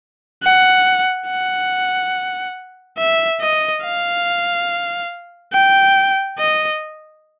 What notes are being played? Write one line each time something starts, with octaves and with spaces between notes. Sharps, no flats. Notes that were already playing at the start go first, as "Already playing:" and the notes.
F#5
F#5
E5
D#5
F5
G5
D#5